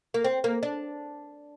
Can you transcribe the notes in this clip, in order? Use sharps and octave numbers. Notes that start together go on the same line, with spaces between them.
A#3
C4
A#3
D4